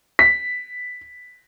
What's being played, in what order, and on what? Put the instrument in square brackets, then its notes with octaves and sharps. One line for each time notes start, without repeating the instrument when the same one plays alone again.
[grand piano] B6